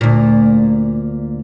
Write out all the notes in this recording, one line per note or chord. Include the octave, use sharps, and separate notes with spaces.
D2 A#2